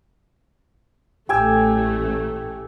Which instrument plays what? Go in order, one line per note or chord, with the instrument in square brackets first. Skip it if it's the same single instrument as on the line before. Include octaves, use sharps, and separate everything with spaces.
[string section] A1 A3 [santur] G4 G#5 E6